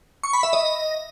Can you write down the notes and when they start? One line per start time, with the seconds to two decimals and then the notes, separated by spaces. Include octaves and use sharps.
0.23 C#6
0.33 B5
0.43 E5
0.53 D#5